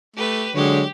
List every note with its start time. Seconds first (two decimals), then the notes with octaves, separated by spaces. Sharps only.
0.16 A3 G4 B4
0.55 D3 F#3 G#3 G4 C#5